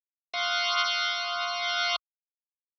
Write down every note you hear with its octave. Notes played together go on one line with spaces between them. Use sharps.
F5 C6 C#6 D#6 F6 F#6